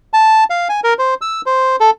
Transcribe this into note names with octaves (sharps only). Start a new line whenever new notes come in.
A5
F5
G#5
A#4
C5
E6
C5
A4